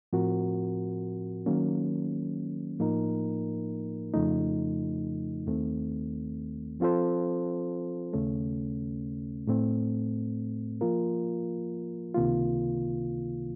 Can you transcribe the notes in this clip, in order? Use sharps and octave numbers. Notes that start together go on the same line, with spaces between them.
A2 F3 C4 F#4 A#4
D#3 F#3 A#3 C#4
A2 F3 A#3 D#4 A#4
F2 C#3 F3 A3 D#4
D#2 D#3 A3 C4
F3 C4 F4 A4 C5
D#2 C#3 A3 C#4
A2 A3 C4
F3 A#3 F4 A#4
C#2 C3 D#3 A#3 F4